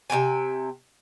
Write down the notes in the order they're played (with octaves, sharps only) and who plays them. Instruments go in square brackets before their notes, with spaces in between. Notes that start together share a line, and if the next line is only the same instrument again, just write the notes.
[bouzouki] C3 F4 G5 G#5